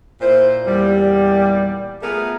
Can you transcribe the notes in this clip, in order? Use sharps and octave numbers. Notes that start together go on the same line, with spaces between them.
A#2 E4 C5
E2 A#2 G3
A3 B3 F4 G#4 A#4